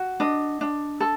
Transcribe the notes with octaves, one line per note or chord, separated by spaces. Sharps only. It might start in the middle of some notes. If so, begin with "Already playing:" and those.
Already playing: F#4
D4 D#5
D4
A4